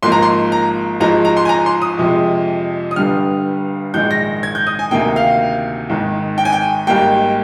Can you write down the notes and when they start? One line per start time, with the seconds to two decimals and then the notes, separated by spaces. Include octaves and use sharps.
0.02 G#1 G#2 F3 A#3 C6
0.12 A#5
0.22 C6
0.52 A#5
1.00 G#1 G#2 F3 G#3 A#5
1.25 A#5
1.37 C6
1.45 G#5
1.49 A#5
1.66 C6
1.82 D#6
1.98 F2 C3 F3 G#3
2.91 D#6
2.96 G1 G2 D3 G3 F6
3.94 A#1 G#2 D#3 G#3 G6
4.11 A#6
4.43 G#6
4.55 G6
4.67 D#6
4.79 G#5
4.91 D2 C3 D#3 A#3 G5
5.16 F5
5.89 G#1 G#2 D#3
6.38 G5
6.45 G#5
6.53 G5
6.87 G#1 G#2 G3 A#3 G5